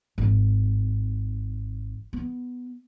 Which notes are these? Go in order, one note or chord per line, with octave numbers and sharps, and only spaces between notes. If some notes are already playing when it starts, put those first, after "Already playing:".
G#1
B3